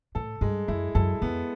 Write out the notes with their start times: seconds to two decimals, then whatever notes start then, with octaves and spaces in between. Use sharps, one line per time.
0.15 A2 A4
0.41 G2 G#3
0.68 F#2 E4
0.95 F#2 A4
1.22 F2 B3